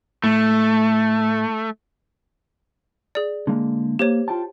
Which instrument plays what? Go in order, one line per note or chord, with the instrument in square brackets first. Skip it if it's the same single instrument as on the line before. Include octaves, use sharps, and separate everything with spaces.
[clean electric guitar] A2 [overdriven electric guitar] A3
[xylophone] G#4 D5
[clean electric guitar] D3 G#3 A#3
[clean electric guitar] A#3 [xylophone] G4 C5 C#5
[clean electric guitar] F4 G5 A5